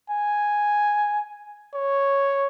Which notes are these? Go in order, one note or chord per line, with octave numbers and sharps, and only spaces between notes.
G#5
C#5